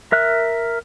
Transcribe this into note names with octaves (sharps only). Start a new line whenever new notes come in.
A#4 E5 F#6